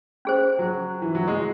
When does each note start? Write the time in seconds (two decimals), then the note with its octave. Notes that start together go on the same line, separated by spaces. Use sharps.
0.25 C#4 G#4 C5
0.59 F#3
1.02 E3
1.15 F#3
1.28 G#3